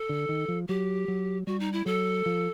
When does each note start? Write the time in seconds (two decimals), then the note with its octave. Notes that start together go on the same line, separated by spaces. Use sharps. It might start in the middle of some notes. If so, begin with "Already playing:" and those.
Already playing: A4
0.09 D3
0.29 D#3
0.48 F3
0.68 F#3 G4
1.08 F#3
1.47 G3 F#4
1.60 D#4
1.73 E4
1.86 F#3 A4
2.26 F3